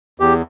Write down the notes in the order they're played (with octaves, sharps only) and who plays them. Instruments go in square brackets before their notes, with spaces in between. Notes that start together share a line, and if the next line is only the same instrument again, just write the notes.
[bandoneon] E2 G4